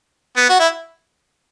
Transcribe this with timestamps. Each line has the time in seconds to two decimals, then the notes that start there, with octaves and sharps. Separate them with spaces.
0.37 B3
0.49 F#4
0.60 E4